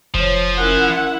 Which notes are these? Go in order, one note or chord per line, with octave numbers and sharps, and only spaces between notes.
F1 F3 C5 C#5
C#4 E4 A#4 F#5 G#5